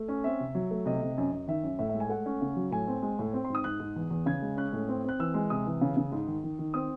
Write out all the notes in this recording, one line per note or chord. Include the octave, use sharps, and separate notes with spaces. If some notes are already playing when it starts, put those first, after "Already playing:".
Already playing: A3
C#4
C4 E5
C3
F#3
A3
C3 D#5
C3
F#2
F#2
D#3 E5
F#2
A2 E5
E5
G#3
G#5
A3 F#5
C#4
C#3
F#3
A2 G#5
C4
G#3
A2
C4
C6
G#2 D#6
G#2 F#6
G#2
E2
E2
C#3 G#6
G#3
C#4 F#6
A2
C4
C4 F#6
E3 E6
G#3
C3 D#6
E3
C#3
C#3
G#2
D#3
D#3
D#3
C4 D#6